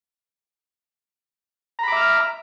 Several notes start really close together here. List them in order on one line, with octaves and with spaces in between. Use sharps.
A#5 B5 D6 E5 F6